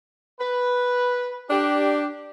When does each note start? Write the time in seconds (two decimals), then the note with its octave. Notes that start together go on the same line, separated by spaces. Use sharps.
0.40 B4
1.50 D4 G4